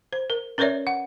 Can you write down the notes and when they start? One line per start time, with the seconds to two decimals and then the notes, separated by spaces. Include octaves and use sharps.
0.13 C5
0.30 A#4
0.58 C#4 A#4 B4 C#5 D5 E5
0.87 F#5